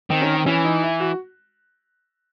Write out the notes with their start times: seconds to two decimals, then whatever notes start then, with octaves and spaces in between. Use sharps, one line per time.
0.10 D#3 C4
0.22 C#4
0.34 C4
0.46 E3 C#4
0.65 D#4
0.82 E4
1.00 F#4